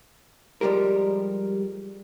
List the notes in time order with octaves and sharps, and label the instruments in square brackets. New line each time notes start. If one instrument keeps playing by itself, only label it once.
[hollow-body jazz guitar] F3 G3 G#3 G4 A#4